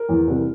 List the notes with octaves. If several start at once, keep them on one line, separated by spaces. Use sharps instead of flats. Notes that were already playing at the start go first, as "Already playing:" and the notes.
Already playing: A#4
E2
C2